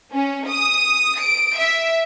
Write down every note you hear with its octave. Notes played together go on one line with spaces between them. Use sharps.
C#4
D#6
D7
E5